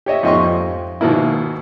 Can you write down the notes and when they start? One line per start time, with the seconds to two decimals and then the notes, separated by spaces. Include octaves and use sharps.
0.06 G4 C#5 D#5 E5
0.23 F2 G#2 G4 D#5 C6 C#6
0.44 F2
1.01 G#2 B2 D#3 A#3 E4